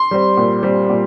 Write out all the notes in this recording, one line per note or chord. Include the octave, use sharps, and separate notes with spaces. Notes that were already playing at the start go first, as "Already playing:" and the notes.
Already playing: C6
G3 C4
A#2
G3 C4
A#2